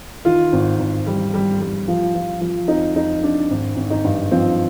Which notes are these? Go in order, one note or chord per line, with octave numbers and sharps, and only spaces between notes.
D#3 F4
G#1
G#1
G3
G3
G3
F3
F3
F3
F2 D#4
F2 D#4
F2 D4
G#1
G#1
D#4
G2
F3 C4